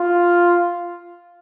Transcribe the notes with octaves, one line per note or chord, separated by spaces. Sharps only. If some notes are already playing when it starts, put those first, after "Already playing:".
Already playing: F4